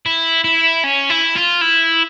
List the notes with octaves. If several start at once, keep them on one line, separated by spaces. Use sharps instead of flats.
E4
E4
C#4
E4
F4
E4